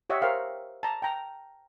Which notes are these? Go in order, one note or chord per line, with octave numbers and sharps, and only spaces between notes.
G4 C#5 D#5 E5 F#5
A#4 C5 F5 G5
A5 A#5
G5 A#5